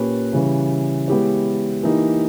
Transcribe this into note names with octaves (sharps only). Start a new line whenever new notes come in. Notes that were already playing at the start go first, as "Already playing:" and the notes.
Already playing: A#2 A#3 C#4 G4 B4
C#3 E3 G3 C#4
G#3 B3 E4 G4 C#5
E3 A#3 D#4 G4